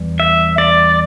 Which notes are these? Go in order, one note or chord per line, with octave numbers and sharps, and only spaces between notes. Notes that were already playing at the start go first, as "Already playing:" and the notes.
Already playing: E2 E3 G3
E5
D5